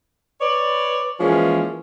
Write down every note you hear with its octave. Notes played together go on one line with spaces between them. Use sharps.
B4 C#5 D5
E3 F3 G#3 A#3 C#4